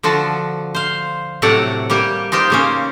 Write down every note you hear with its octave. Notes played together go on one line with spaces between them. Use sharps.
D3 F3 F#4 A5
C5 F5
A2 C3 F#3 A4 D5 F#5
G3 A#3 G4
D#4 F4 G4 C5
C#3 A#3 C#4